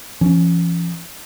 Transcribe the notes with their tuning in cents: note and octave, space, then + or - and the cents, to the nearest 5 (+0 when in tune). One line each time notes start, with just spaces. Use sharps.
F3 -40 C#4 +0